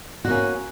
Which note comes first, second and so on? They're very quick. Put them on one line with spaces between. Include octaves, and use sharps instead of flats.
F#4 A#3 C#4